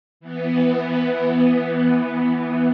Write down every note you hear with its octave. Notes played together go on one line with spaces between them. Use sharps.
E3 B3